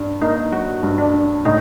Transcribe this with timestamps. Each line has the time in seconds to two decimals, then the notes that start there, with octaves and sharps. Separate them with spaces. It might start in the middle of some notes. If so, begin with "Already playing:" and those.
Already playing: G2 D4
0.22 A#3 D#4
0.52 F#3 F#4
0.83 G2
0.98 D4
1.14 D4
1.45 A2 D#4